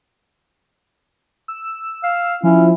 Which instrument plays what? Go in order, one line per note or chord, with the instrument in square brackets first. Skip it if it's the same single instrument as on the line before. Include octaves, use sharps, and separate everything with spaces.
[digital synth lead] E6
[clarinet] F5
[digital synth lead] F3 [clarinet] C#4 [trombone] E4